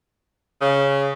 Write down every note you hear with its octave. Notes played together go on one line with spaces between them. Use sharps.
C#3